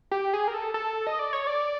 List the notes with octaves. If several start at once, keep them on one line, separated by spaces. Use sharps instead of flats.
G4
G#4
A#4
A4
A4
D#5
D5
C#5
D5